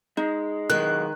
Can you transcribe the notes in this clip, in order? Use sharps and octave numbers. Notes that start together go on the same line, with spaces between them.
G#3 D#4
B1 D#3 G#3 F#6